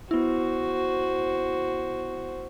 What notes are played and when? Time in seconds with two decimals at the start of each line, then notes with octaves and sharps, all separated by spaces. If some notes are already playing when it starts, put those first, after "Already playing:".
0.11 B3 E4 F#4 C5